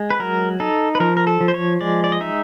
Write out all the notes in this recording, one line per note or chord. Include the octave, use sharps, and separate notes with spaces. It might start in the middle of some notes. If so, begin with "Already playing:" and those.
Already playing: G#3
B4
F#3 A#4
D#4 A4
B4
F3 A#4
A#4
A4
F3
C5
C#5
G#3 D5
D5
D#5
D#4 E5